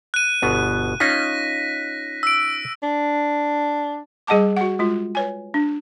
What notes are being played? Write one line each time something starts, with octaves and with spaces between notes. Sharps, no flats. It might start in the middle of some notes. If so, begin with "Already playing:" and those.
F#6 D#7
G1 B2 B3
C#4 D#4 F4 A#6 B6
E6 D7
D4
G3 G#4 D#5 F#5 A5 D6
F#4 F#5
G#3 F4
B4 C#5 G#5
D4